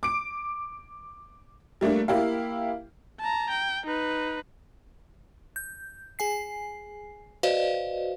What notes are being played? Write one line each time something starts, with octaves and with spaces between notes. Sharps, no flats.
D6 D7
G3 A3 A#3 D4
A#3 E4 G4 F5
A5 A#5
G5
D#4 B4
G6
G#4 G#5 C7
F#4 B4 C5 D5 D#5 F5